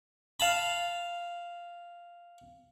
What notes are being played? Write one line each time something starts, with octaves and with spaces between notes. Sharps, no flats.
F5 A5 B5